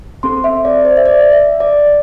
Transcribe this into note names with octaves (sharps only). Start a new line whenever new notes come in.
C4 A4 C6
E5
D5
C5
E5
D5
E5
D5